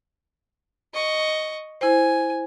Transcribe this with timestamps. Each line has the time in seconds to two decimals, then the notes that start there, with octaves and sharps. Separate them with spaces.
0.94 D#5 C#6
1.81 E4 C5 G#5